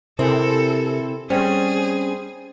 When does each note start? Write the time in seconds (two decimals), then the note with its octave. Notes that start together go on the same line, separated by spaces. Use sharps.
0.19 C3 C4 E4 A4 A#4 G#5
1.30 G3 C4 C#4 G#4 C5 G5